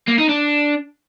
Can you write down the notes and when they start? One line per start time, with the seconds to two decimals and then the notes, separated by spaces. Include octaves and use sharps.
0.08 A#3
0.19 D#4
0.29 D4